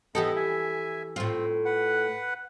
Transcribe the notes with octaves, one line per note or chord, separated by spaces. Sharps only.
E3 B3 G4 A4 D#5
E5 G#5
A2 C4 F4
B4 F#5